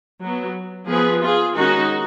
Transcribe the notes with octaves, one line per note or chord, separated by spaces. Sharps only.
F#3 B3
F3 B3 G#4 B4
F4 G#4
D#3 G#3 C#4 D#4 F#4